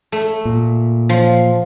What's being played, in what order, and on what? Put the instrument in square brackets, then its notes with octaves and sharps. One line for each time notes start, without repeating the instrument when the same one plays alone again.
[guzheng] A3
[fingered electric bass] A#2
[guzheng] F3